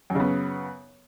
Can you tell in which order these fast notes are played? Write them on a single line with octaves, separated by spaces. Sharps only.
F#2 C#3 B3